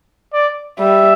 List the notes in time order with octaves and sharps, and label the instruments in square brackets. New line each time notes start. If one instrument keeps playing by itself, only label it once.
[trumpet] D5
[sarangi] G3 [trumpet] E5